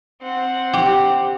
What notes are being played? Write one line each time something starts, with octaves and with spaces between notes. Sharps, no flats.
C4 F#5
G4